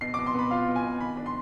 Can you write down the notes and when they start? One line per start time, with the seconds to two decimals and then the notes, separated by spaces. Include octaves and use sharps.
0.01 B2 C7
0.14 D6
0.19 B2
0.26 C6
0.34 B3 B5
0.51 F4 F5
0.68 B2
0.76 G#5
0.84 B2
1.01 D#3 B5
1.17 D4
1.26 C6